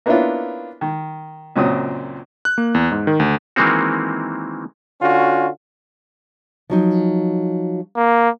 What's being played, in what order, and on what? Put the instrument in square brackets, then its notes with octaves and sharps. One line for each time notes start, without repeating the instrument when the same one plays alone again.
[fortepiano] A#3 B3 C#4 D4 E4 F4
D#3
C#2 F#2 A#2 C4 D#6
[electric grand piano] F#6
A#3
E2
G#2
D#3
D2
[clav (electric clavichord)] D#3 E3 G#3 A#3 C4 F#4
[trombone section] D3 C#4 F4 F#4
[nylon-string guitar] F3 F#3 D#4
[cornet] A#3